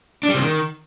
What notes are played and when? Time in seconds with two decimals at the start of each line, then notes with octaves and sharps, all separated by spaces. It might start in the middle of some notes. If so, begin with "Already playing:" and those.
0.23 D4
0.29 G3
0.34 C3
0.40 D#3